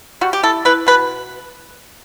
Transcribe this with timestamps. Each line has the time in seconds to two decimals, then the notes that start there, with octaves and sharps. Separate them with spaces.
0.21 G3 F#4
0.33 G4
0.43 E4 A4
0.65 E4 B4
0.87 B2 B4